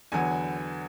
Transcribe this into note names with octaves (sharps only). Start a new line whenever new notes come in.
E2 D3 F#3 B3 G#5